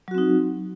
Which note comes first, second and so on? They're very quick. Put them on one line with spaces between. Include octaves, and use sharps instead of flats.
F#3 F#4 C4 D#4